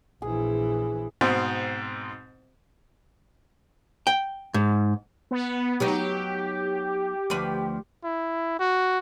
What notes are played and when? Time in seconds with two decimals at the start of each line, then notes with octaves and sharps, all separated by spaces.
0.22 A#1 E3 G#4
1.21 G#2 B2 C4
4.07 G5
4.54 G#2
5.31 B3
5.80 F#3 B3 D#4 G4
7.30 D2 F3 B4
8.04 E4
8.60 F#4